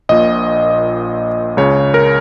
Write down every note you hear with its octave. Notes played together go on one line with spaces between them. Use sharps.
A#1 A#2 D#5
C#2 C#3 C#5
A#4